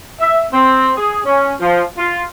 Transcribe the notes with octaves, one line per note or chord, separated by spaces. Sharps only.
E5
C4
G#4
C#4
F3
F4